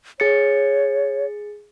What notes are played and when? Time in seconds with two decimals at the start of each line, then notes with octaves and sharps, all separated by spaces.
0.20 G#4 C#5 A6 C#7